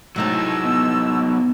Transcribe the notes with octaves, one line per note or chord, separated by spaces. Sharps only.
A2 C3 F#3 G#3 D#4 E6
B3